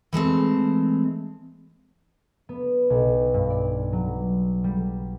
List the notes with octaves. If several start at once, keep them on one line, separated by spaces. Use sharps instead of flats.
E3 G#3 A3 C4
B3
B1
G2
D5
F#3
G3